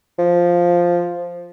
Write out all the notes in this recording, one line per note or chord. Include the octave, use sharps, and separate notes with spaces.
F3